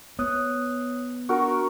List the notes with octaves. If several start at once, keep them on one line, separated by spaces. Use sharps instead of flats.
B3 C#5 D#6 F#6
D4 F#4 A#4 C#6